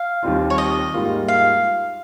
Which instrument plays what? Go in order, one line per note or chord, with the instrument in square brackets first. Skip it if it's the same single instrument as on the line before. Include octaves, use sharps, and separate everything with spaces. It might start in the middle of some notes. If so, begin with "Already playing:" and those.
Already playing: [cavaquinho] F5
[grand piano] D#2 D#3 G3 C4 F4
[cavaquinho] C#5
D#5
[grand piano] G#2 G3 A#3 F4
[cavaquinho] F5